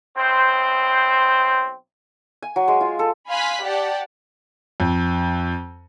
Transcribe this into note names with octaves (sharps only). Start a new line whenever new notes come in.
B1 C4 C5
G#5
F#3
G#3
F4
A4
F5 G#5 B5 C6 F#6 B6
G4 D5 F#5 A5
F2